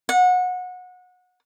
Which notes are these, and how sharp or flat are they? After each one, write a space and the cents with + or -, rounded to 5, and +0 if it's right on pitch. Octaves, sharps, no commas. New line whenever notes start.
F#5 -25